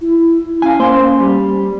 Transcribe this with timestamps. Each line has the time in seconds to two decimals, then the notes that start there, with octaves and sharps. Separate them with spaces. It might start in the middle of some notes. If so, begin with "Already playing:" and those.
0.01 E4
0.62 C#4 F5 G#5
0.79 A#3 C5 C6
1.20 G3